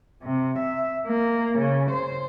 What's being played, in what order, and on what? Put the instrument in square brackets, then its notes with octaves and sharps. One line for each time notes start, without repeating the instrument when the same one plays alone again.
[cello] C3
E5
A#3
C#3
C5